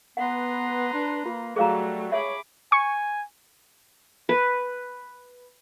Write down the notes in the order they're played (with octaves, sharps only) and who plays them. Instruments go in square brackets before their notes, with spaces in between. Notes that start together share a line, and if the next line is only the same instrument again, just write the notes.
[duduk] B3 [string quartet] B4 A#5 C6 [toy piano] F#5
[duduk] D4
[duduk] A#3 [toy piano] F4
[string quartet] F#3 G3 A3 [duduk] F#4 [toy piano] G#4 F5 A#5
[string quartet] G#4 B5 D6 [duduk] C#5 [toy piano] E5
[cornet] G#5 [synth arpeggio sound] C#6
[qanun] B4